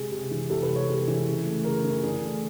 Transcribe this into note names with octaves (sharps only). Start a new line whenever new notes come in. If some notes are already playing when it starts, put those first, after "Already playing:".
Already playing: C3 G#3 G#4
C3
E3
C3 A4
B4
G#3
C#5
C3
E3
C#3
A3
C#3 A#4
E3
D3 G#4
A3